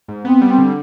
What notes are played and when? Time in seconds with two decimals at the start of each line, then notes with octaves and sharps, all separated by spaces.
0.08 G#2
0.25 B3 C4
0.42 G3
0.47 C4
0.58 D3